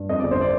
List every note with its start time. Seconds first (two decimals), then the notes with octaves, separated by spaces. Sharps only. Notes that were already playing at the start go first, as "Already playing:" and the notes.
Already playing: G2
0.09 F2 D#5
0.20 G1 D5
0.31 C5
0.41 D5